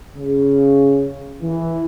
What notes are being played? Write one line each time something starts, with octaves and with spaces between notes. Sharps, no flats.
C#3
E3